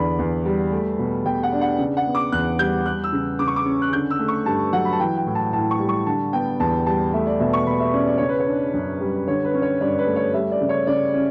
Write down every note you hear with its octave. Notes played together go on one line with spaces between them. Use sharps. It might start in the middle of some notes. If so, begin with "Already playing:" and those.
Already playing: E2 D3 D5 B5
E2
G3
A3
B2
B2 G5
F#5
D4
F#5
C#3
F#5
B3
D6
E2 F#6
G3 G6
G3 F#6
E6
C#3
C#3 D6
C#6
D6
C#4
F#6
D3 G6
E6
A3
C#6
G2 A5
F#3 F#5
B5
A5
E3 G5
G5
A2
A5
A2 A5
C#6
G3
C#6
D3 A5
B3 G5
E2 A5
G3 A5
A3 E5
D5
B2 E5
C#6
B2 B5
E5
C#4 D5
D5
C#3 C#5
B4
C#5
D4
F#2
G3
D3 C#5
B4
C#4
C#5
G2 D5
B4
A3
C#5
G3 E5
D5
C#3
C#5
C#3 D5
C#4